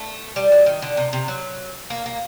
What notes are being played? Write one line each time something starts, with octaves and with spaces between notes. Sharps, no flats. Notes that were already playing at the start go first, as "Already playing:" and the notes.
Already playing: A3
G3
F#3
D#3
D3
C3
C3
F#3
A#3
A#3